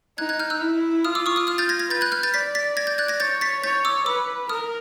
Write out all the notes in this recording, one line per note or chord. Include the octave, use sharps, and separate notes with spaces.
D#4 F#6 G#6
F#6 G#6
F6 G6
E6 F#6
E4
F4 D#6 F6
D6 E6
C#6 D#6
D#6 F6
D#6 F6
G6 A6
G#6 A#6
G#6 A#6
B4 G6 A6
F#6 G#6
F6 G6
G6 A6
D5 A6 B6
A6 B6
G#6 A#6
G6 A6
F#6 G#6
G#6 A#6
C#5 G6 A6
A6 B6
C#5 G6 A6
D6 E6
B4 D6 E6
A#4 D#6 F6